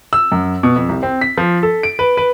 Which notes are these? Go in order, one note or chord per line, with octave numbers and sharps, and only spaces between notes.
E6
F#2
B2
F2
C2
C4
B6
F3
A4
D7
B4
B4